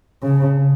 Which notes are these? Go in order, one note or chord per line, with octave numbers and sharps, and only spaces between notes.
C#3